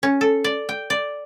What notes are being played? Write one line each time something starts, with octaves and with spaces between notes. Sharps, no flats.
C#4
A4
D5
G5
D5